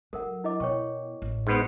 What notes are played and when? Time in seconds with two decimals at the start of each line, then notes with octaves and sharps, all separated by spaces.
0.13 F#3 A4 A#4 F#5
0.44 E4 D#5 D6
0.60 B2 C#5 G5 C#6
1.22 A1
1.47 G#2 B3 C6